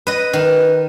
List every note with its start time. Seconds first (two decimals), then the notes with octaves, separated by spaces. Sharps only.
0.07 B4 D#5
0.33 D#3 B4